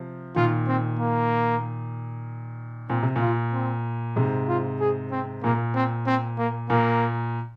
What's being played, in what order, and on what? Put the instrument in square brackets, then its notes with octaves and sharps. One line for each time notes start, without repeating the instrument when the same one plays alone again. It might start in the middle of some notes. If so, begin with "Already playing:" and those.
Already playing: [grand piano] C3 F3
[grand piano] A#2 D#3 [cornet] F4
[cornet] C4
A#3
[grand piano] A#2 [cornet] C4
[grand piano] C3
A#2
[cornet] F4
C4
[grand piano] G#2 C3
[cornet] F4
G#4
C4
[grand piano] A#2 [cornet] A#3
[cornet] C4
C4
A#3
[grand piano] A#2 [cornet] A#3